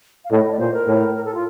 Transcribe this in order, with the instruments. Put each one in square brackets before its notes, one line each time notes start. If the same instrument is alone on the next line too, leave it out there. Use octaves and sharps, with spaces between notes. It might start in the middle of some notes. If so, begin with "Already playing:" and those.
[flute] F5
[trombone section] A2 [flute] D#5
[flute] D5
[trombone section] A#2 [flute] C5
[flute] A#4
[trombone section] A2
[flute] A#4
A4
F4